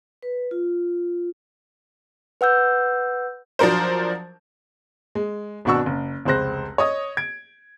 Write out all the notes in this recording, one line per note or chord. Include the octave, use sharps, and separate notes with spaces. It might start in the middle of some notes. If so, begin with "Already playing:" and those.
B4
F4
B4 F#5 E6 G6
F3 F#3 D4 A#4 C5
G#3
G#1 B2 D4 F#4 C#6 E6
F#1
F1 C#2 G#3 C5 F#6 A#6
C#5 D#5 D#6
G#6 D7